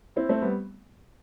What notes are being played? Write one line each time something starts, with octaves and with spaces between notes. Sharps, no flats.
C4 E4
A3 C4
G3 B3